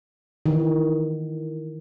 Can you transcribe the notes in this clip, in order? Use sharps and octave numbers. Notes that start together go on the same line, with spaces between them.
D#3 E3